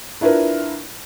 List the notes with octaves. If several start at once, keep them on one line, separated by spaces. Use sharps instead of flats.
D4 E4 F4 A#4 B4